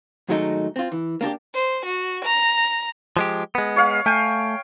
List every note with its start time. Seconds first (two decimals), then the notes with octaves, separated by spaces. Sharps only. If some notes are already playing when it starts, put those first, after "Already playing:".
0.29 G#2 D#3 F#3 G#3 A3 D#4
0.76 C4 F4
0.92 E3
1.21 A#3 D4 F#4 G4
1.54 C5
1.86 F#4
2.25 A#5
3.17 F3 G#3 G4
3.55 G#3 B3
3.76 C#5 F5
4.06 A3 G5 G#5